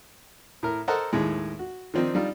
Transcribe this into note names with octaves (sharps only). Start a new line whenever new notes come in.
A2 A#4
A4 A#4 C5 D#5 F#5
D#2 A2 G#3
F#4
D#3 F3 C4 D4 D#4
G3 D4 D#4 F4